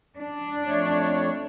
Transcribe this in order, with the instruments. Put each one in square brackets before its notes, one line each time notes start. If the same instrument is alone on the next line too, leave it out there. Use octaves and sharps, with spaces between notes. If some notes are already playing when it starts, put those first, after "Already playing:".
[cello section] D4
[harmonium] F2 A3 C#5